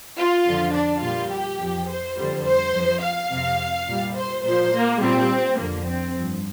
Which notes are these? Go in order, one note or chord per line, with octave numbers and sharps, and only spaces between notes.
F4
F2 D3 F3
D4
A#2 G3 F4
G4
F2 F3
C5
F2 D3 G3
C5
F2 F3
F5
F2 C3 F3
A#2 G3
C5
A#2 F3 C5
A#3
A#2 G3 C4
F2 D3 F3 A#3
C4
G2 F3